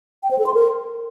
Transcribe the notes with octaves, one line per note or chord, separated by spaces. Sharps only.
G5
C5
A4
C6
A#4